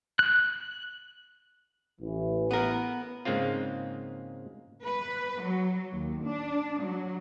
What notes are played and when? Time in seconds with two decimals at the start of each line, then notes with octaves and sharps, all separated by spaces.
0.19 F#6
2.01 A1 E3
2.51 B3 A#4
3.25 G#2 C#3 G#3 A#3 C4 F4
4.84 B4
5.42 F#3
5.93 D#2
6.26 D4
6.82 F#3